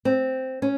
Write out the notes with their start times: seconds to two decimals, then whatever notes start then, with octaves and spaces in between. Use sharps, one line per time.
0.05 C4
0.62 C#4